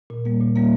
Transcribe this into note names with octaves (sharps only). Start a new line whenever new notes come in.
A#2
G3 A#3
A#2
G3 A#3